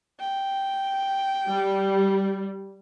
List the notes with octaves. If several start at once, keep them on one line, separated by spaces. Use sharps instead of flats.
G5
G3